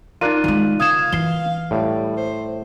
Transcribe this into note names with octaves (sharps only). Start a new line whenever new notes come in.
D#4 F4 A#4 D5 F#6 D#7
D#3 G#3
D3 F5 D#6 G#6 E7
E3 C7 G7
A2 G3
C5